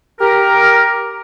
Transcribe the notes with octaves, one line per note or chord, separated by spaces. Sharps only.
G4 A#4